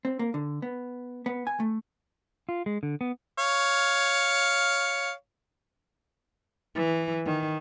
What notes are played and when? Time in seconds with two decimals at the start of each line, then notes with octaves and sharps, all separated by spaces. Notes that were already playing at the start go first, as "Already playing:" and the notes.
0.05 C4
0.19 A#3
0.34 D3
0.62 B3
1.26 B3
1.47 G#5
1.60 A3
2.49 F4
2.66 G#3
2.83 D3
3.01 B3
3.38 C#5 F5
6.75 E3
7.26 D#3